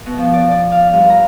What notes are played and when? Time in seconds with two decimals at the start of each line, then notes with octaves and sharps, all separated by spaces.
0.06 B2
0.18 F3
0.33 D5
0.51 D5
0.72 F5
0.93 G2
1.10 A#5